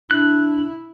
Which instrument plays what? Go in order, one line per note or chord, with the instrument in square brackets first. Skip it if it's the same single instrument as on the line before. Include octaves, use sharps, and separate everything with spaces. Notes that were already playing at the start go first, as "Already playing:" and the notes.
[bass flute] D4 [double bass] E4 [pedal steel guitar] F#6